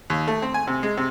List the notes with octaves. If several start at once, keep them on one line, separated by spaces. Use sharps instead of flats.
D#2
A3
C4
G#5
C3
G#3
C3